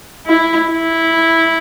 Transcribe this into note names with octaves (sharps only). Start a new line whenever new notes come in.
E4
E4